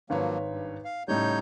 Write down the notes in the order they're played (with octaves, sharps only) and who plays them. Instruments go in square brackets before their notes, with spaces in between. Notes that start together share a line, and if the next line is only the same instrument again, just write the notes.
[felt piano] G#1 B4 C#5 [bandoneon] F3 F#3 A#3
[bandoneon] G2
F5
[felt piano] A2 C#3 G3 [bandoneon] D#4 C#5 G6